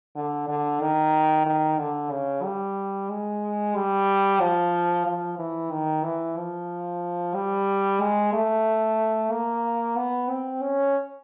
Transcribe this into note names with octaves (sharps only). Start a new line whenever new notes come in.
D3
D3
D#3
D#3
D3
C#3
G3
G#3
G3
F3
F3
E3
D#3
E3
F3
G3
G#3
A3
A#3
B3
C4
C#4